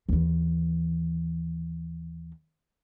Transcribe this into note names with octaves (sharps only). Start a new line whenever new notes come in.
D#2 E3